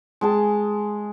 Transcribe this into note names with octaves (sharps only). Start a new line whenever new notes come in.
G#3 G#4 A5